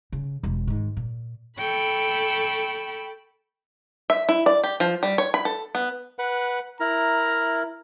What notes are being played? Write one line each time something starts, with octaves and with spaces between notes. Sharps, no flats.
C#3
E1 E3
G#2 D#3
A#2
A4 G5 B5 C#6 E6
E5
E4
D5
G4
F3
G3
C#5
B5
A4
B3
B4 F#5
E4 A#4 A#5